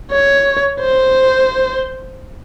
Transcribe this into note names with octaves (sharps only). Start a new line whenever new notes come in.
C#5
C5